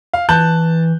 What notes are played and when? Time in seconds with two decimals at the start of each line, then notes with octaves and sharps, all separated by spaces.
0.14 F5
0.29 E3 A5 F#6 G6